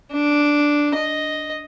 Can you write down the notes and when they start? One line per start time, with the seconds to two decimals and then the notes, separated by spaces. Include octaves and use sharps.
0.13 D4
0.95 D#5